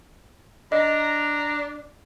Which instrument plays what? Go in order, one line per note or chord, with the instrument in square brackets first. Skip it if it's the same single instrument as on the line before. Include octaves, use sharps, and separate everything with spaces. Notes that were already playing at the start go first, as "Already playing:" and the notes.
[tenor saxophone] D4 [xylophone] D#5 [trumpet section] A#5